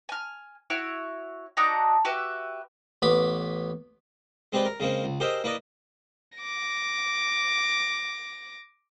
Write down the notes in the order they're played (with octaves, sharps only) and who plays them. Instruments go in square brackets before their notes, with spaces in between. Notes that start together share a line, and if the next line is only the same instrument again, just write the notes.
[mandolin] G#5 F6
E4 F#4 C#5
D4 D#4 F#4 A#5
F#4 G4 B4 E5
[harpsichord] A1 B3 B5 D6
G#3 C4 G4 B4 D5
A#4
C#3 G#3 A#3 C4
C#2
G4 G#4 A#4 C5 D#5 E5
A#3 E4 B4 D5 D#5
[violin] D6 A#6